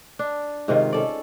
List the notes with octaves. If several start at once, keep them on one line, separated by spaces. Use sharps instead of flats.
D4
G#2 C3 D#3 F4
C#4 A4 D5